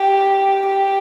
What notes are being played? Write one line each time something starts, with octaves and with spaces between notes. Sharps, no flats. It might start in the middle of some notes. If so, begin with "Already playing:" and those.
Already playing: G4
G4